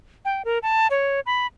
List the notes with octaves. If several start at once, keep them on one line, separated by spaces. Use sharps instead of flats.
G5
A#4
A5
C#5
B5